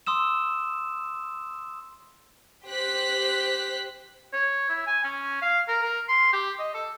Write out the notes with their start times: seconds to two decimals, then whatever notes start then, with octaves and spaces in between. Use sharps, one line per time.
0.07 C6 D#6 E6 E7
2.66 G4 C5 F#6 B6
4.33 C#5
4.69 E4
4.87 G#5
5.04 C#4
5.42 F5
5.68 A#4
5.82 A#4
6.08 C6
6.33 G4
6.59 D#5
6.74 A4